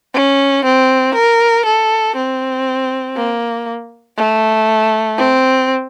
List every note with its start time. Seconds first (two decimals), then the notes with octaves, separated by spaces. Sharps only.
0.14 C#4
0.65 C4
1.15 A#4
1.66 A4
2.16 C4
3.16 A#3
4.17 A3
5.18 C4